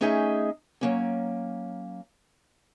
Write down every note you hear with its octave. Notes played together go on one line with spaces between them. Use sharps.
A3 C#4 D#4 G#4 D#5 E5
F#3 A#3 C#4